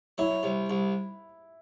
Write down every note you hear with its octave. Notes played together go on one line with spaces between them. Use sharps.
F#3 E4
C2
C2